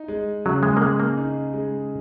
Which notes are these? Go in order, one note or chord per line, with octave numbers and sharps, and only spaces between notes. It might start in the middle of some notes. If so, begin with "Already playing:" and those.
Already playing: D#4
G#3
C#3 F#3
G#3
A#3
G#3 G#4
A#3
D#4
G#3